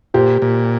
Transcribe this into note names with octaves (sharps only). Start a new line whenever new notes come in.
A#2 G4 C5
A#2